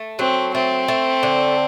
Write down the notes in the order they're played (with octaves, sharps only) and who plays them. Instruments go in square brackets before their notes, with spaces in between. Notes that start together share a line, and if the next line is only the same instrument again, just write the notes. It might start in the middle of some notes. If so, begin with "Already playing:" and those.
Already playing: [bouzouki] A3
[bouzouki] F#3 [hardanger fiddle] C4
[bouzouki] A3 [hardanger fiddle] C4
[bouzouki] A3
D3